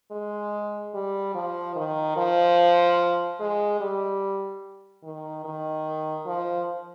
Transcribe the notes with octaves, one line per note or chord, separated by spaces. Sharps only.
G#3
G3
F3
D#3
F3
G#3
G3
D#3
D#3
F3